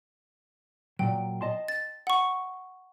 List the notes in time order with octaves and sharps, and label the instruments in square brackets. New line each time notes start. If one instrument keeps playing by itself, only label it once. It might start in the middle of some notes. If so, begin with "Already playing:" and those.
[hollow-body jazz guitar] A#2 F#3 [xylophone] G5
[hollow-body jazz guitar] D#5 A5 C6
[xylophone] A6
F#5 C#6